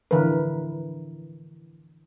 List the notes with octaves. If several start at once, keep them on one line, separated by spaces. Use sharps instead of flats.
D3 E3 F3 A#4 B4